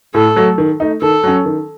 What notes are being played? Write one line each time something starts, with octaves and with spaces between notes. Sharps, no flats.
A2 A4
F#3 A3
D#3
A3 D#4
D#3 A4
F#3 C#4
D#3